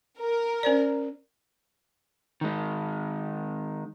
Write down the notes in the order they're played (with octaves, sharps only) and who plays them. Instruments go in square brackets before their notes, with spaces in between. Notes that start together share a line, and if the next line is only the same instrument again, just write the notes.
[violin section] A#4
[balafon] C#4 C5 D5
[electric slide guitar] D#3 G#3